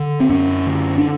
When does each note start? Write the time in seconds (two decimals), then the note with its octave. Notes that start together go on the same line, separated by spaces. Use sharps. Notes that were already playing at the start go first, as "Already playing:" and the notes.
Already playing: D3
0.20 C4
0.29 F#2 C#4
0.66 D3
0.98 D4